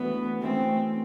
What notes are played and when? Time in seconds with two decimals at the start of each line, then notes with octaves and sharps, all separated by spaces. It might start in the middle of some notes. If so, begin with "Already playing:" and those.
Already playing: E3 A3 B3 D4 F#4
0.42 E3 A3 C4 C#4